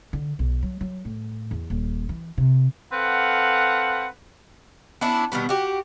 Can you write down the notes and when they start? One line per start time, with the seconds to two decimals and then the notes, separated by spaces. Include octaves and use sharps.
0.13 D3
0.39 B1
0.63 F#3
0.81 F#3
1.05 A2
1.51 E2
1.70 D#1
2.09 E3
2.38 C3
2.92 C4 A4 B4 F5 F#5
5.01 B3 C#4 D4 E4
5.32 B2 D#3 G3 B3
5.49 F#4 G4